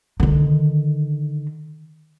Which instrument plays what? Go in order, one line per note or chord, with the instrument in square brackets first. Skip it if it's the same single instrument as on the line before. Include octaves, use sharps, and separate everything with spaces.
[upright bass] D3 D#3